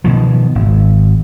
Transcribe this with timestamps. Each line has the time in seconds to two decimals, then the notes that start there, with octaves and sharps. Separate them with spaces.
0.04 B2 D#3 F3
0.55 G#1